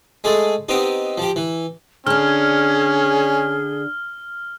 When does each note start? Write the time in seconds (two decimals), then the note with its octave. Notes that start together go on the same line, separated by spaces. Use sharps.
0.24 G#3 A3 G#4 A4
0.69 B3 C4 D#4 G4
1.18 F3 G4
1.36 E3
2.07 D3 C#4 D4 G#4 F6